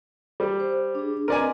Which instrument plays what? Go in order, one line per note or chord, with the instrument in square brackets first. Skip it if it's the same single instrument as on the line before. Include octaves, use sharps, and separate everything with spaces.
[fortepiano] G3
[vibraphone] C5
D4 G#4
[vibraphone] C4 B4 D#5 [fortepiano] A#4 D5 G#5